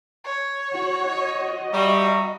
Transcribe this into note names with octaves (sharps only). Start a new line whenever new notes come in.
C#5
F#4
F#4 D#5
G3 E5 A#5 C#6